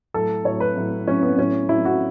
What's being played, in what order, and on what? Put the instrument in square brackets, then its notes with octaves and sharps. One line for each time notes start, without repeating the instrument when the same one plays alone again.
[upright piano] A2 F#3 A4
A2 F#3 C#5
B4
A2 F#3
A2 F#3 C#4
B3
A2 F#3 C#4
A2 F#3 E4
F#4